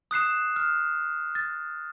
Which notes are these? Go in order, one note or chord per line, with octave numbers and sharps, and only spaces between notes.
D#6 F#6 C7 E7
F6
A6